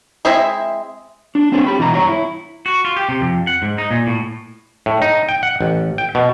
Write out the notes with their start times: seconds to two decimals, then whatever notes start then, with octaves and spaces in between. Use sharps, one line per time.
0.25 G#3 C4 E4 E5
1.35 D4
1.52 F#3 C4 D4 A4 B4 C#5
1.67 G4 B5
1.79 B2 E3 F#3 F#4 A#5
1.94 G2 C#5 A#5
2.08 E4
2.66 F#4
2.85 F4
2.97 G4
3.09 C3
3.21 F2
3.47 F#5
3.62 G#2
3.78 D#4
3.91 A#2
4.07 A2
4.86 A2
5.02 D#4
5.29 G5
5.43 F#5
5.61 A1
5.98 G5
6.15 B2